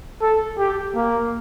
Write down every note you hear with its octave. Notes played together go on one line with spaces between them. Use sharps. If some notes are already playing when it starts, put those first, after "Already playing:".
A4
G4
A#3